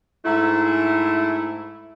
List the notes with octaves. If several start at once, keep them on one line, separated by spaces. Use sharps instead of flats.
G#2 A3 E4